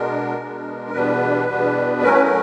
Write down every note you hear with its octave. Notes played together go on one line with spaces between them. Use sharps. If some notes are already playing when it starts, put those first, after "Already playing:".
Already playing: B2 G#3 B3 D4 A#4
B2 G#3 B3 D4
E2 B2 G3 B3 D4 B4
E2 B2 G3 B3 D4
A2 F#3 A3 C#4 A#4
B4
A#4